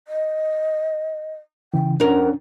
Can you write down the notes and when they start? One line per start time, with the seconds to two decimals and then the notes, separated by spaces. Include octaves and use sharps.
0.08 D#5
1.74 C#3 E3 G5
2.00 F2 C#4 D4 A#4 F#5